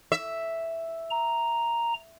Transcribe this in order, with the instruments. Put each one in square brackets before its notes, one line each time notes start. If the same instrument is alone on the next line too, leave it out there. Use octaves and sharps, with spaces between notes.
[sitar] E5
[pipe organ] A#5